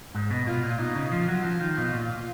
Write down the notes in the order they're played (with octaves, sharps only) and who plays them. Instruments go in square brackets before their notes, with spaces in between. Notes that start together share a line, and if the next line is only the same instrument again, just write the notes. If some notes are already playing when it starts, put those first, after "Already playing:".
[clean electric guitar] G#2
B2
[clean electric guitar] B2 [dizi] F4
[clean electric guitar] A#2
[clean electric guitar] B2 [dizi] D#4
[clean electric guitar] C#3
[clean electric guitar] F3 [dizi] F4
[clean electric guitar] F#3
F3
D#3
B2
A#2